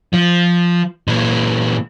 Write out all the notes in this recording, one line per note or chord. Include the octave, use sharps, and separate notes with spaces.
F3
A#2 E3